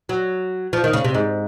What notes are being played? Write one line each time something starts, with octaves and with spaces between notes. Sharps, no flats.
F#3
F3
D#3
C#3
C3
G#2